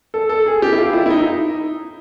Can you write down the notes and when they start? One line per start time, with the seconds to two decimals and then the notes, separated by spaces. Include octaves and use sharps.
0.14 A4
0.29 A4
0.46 G#4
0.62 G4
0.73 E4
0.78 F4
0.93 E4
1.06 E4
1.10 D#4